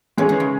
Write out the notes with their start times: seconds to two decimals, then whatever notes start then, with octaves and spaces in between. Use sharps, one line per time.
0.18 E3 G#3 C#4 G#4 C#5
0.29 D#3
0.40 C#3